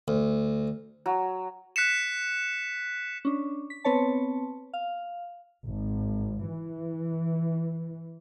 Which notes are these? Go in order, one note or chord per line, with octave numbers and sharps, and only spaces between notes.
D2
F#3
F#6 B6 C#7 E7
C#4 D4
B6
B3 C4 B4 C#5 A5
F5
G#1
E3